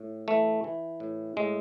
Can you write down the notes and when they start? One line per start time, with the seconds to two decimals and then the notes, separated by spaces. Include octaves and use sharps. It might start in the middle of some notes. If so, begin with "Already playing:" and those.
Already playing: A2
0.28 E3 A3
0.64 E3
1.00 A2
1.37 A2 G#3